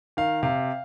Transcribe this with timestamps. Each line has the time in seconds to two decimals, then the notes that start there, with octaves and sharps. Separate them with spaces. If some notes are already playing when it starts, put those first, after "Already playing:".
0.17 D#3 F5
0.43 C3 F5